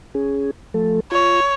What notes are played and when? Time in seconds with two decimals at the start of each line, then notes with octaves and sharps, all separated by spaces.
0.15 C#4 G#4
0.74 F3 A3 A4
1.12 F4 C#5